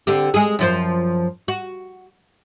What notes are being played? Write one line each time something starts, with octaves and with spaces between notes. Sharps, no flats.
D3 C4 G4
G#3 G#4
F#2 F3 C5
F#4